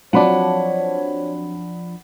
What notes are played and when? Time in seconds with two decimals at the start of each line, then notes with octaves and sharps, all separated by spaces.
0.13 F3 F#3 C4 D4 C5 C#5 F#5 B5